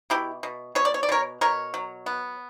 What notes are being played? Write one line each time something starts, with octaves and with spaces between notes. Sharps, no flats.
B2 E4 G4
B2
B2 C#5
D5
C#5
D5
B2 A#4 C#5
B2 A#4 C#5
F#3
B3